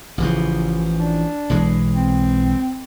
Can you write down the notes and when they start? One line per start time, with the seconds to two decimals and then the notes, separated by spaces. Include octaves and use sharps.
0.18 A1 C#3 E3 F3
1.00 D4
1.50 B1 E3 G#3
1.94 C4